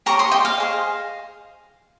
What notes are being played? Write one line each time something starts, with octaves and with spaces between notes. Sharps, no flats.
G4 A#4 C#5 A#5 C#6
C6 D#6
D#5 G5
F5
G#4 C5 D#5